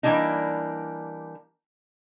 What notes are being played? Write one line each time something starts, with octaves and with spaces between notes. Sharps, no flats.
E3 G3 A3 A#3 D4 D#4